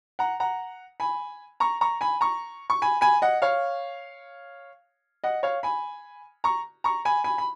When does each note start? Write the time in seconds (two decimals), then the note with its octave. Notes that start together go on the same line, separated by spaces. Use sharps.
0.19 F#5 A#5
0.40 F#5 A#5
1.00 G#5 B5
1.60 A#5 C#6
1.81 A#5 C#6
2.01 G#5 B5
2.21 A#5 C#6
2.70 C#6
2.82 G#5 B5
3.01 G#5 B5
3.22 D#5 F#5
3.42 C#5 F5
5.24 D#5 F#5
5.43 C#5 F5
5.63 G#5 B5
6.44 A#5 C#6
6.84 A#5 C#6
7.05 G#5 B5
7.24 G#5 B5
7.38 B5